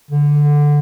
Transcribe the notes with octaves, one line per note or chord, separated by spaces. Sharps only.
D3